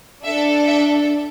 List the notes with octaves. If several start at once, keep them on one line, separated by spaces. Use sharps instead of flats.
D4 A4 E5
E5